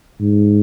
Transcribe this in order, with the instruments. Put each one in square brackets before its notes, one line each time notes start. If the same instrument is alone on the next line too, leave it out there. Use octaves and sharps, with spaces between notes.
[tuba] G#2